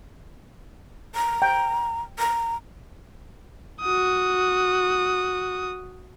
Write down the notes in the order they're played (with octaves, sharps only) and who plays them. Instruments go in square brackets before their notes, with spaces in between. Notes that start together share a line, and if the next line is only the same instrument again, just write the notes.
[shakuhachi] A#5
[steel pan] G5
[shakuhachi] A#5
[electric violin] F#4 D#6